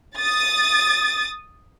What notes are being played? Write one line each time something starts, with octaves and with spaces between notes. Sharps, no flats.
D#6 A6